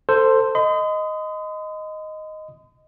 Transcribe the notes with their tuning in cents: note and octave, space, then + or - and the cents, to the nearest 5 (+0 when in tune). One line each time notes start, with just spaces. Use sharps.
A4 +20 C5 +0
D#5 +0 C6 -45